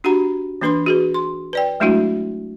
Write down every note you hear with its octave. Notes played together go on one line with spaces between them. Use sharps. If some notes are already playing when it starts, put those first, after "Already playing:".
D4 F#4 G4 F#5 A#5 B5
E3 A#3 D4 B4 B5 C6
F#4 G#4 B4
C6
B4 D5 G5
F#3 G#3 A3 D4 E4 F#4